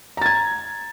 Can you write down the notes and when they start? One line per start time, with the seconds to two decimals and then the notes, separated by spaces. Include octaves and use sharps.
0.17 A#5
0.22 A6
0.26 G#6